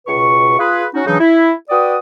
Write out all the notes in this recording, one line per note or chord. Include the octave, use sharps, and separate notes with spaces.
C#2 B2 B4 C#6
F4 G#4 B4
C#4 D#4 F#4
C#3 E3 F#3 D4 D#4
E4
F#4 B4 D5 G5 D#6